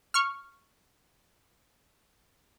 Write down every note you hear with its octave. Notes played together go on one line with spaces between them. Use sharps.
C#6 F6